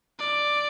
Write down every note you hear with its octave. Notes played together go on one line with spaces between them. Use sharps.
D5